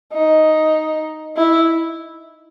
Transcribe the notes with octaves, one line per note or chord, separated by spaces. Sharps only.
D#4
E4